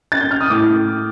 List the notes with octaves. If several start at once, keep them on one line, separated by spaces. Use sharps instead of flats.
A6
G6
F6
D#6
A2 D6